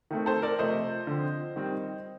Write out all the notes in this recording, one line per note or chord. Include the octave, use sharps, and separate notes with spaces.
D#3 A3 C4
A4 C5
A#4 D5
C3 F3 A3 C5 D#5
D3 F3 C4
D#3 G3 C4